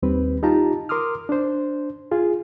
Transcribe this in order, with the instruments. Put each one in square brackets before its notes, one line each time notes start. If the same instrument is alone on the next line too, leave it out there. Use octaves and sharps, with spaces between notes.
[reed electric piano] D#2 G3 C4 B4
D#4 F4 G4 A5 A#5
A#4 C6 D6 D#6 F6
D4 C5
F4 G#4